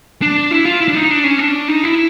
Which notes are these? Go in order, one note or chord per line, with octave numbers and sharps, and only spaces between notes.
D4
E4
F4
E4
D4
D#4
D4
C#4
D4
D#4
E4